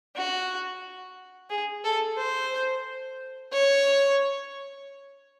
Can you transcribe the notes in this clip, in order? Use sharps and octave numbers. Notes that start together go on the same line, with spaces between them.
F#4
G#4
A4
C5
C#5